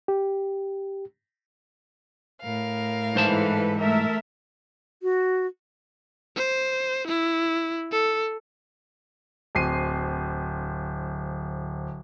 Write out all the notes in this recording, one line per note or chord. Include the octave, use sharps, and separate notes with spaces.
G4
A2 A#4 F5
G#2 E3 A4 B4 C5 A5
A3 A4 A#4 E5
F#4
C5
E4
A4
D1 C4 C7 D#7